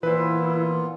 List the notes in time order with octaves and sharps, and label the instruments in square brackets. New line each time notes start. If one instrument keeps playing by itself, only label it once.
[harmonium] A#2 B3 F4 [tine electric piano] E3 [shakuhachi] E4 [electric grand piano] B4 C5